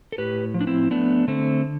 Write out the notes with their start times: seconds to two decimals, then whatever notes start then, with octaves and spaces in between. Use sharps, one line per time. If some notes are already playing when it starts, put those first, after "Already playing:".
0.12 A4
0.18 A2 G4 B4
0.54 F3
0.61 D4
0.67 C4 E4
0.91 A3 B3 D4
1.28 D3 A3 C4